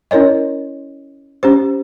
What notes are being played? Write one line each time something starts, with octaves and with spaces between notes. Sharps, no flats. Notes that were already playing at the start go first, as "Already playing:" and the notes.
C#4 E4 A#4 C#5 D#5
C#4 G4 C5